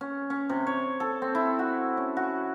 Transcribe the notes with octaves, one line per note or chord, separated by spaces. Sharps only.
C#4
C#4
C3
C#5
A4
C4
E4
F#4
C#4
F#4